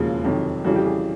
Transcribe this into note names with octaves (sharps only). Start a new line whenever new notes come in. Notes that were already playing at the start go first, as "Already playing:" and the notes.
Already playing: E1 D#2 C#3 F3 G#3
F2 C3 D#3 F#3
F2 C#3 E3 G3 F#4
G4
G#4